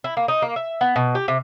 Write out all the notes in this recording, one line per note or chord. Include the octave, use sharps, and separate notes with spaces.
E4
A#3
D#4
A#3
E5
B3
B2
G4
C3